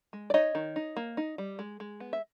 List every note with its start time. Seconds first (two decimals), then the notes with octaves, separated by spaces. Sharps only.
0.13 G#3
0.30 D5
0.34 D#4 C#5 D#5
0.55 D#3
0.76 D#4
0.97 A#3
1.17 D#4
1.38 G3
1.59 G#3
1.80 G#3
2.00 B3
2.13 E5